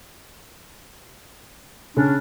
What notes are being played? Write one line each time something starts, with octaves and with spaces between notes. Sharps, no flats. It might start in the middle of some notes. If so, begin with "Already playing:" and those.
C#3 C#4 D4